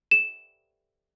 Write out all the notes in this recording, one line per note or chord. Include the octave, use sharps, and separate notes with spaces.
E7